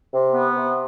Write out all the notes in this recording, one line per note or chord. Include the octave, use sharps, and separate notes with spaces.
C3
B3
C3